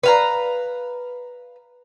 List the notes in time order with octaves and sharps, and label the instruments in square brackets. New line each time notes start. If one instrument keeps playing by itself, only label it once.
[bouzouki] B4 F5 A#5